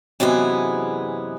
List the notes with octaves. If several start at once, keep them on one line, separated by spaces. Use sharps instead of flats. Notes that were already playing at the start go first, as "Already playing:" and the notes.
F#2 C3 E3 G#3 B3 G#4